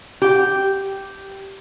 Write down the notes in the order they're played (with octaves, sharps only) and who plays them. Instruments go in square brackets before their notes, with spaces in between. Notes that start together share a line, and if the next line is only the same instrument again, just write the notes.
[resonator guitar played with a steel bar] G4 G5